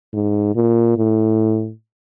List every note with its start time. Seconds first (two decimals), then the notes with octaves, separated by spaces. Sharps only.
0.13 G#2
0.55 A#2
0.97 A2